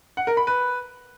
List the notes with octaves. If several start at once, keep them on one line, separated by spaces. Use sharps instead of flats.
F#5
A#4
B5
B4